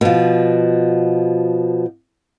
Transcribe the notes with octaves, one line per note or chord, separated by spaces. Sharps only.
B2 F3